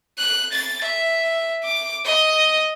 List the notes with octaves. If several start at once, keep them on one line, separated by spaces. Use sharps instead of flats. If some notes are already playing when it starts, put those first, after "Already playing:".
F#6
A6
E5
D6
D#5